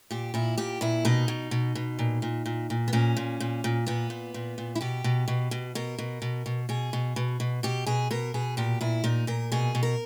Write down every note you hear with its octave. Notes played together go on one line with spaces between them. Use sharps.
A#2 G4
A#2 E4
A#2 G4
A#2 E4
B2 D#4
B2
B2
B2
A#2
A#2
A#2
A#2
B3
A#2 C#4
A#2
A#2
A#2
A#2 B3
A#2
A#2
A#2
E4
B2 G4
B2
B2
B2
B2 A#4
B2
B2
B2
B2 G#4
B2
B2
B2
B2 G4
B2 G#4
B2 A#4
B2 G#4
A#2 G4
A#2 E4
A#2 D#4
A#2 A#4
B2 G#4
B2
A#4